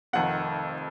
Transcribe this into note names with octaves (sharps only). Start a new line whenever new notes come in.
F1 F2 D#3 F#5